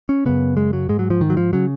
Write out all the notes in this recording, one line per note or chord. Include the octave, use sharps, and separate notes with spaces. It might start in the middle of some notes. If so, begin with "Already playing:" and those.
C#4
F#2 C#3 B3
G#3
F#3
G#2 G#3
F#3
F3
D#3
F#3
F3
C#3 F#3